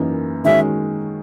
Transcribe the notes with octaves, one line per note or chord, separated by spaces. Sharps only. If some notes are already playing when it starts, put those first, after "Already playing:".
Already playing: F#2 E3 A#3 D#4
D#3 G#3 C#4 F#4 E5